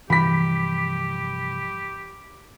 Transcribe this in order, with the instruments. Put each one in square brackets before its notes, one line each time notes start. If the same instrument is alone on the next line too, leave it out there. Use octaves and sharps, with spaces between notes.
[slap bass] G2 C3 F3 [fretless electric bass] E3 [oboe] G4 [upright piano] B5 B6